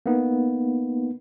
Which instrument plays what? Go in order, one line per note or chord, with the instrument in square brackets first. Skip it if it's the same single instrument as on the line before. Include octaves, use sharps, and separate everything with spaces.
[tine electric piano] A#3 B3 D#4